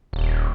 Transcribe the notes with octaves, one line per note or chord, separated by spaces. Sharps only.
D#1